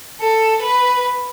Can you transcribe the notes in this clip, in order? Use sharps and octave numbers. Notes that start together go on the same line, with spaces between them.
A4
B4